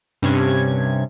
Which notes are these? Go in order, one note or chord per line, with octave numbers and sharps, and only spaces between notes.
G2 C3 C#4 G#6